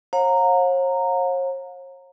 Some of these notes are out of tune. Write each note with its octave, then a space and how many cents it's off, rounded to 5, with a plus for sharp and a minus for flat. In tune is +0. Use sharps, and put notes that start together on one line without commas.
C#5 -45 F5 +45 A#5 -15